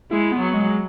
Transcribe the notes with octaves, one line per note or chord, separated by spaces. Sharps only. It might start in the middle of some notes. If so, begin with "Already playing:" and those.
G#3 E4
B3
F#3
G#3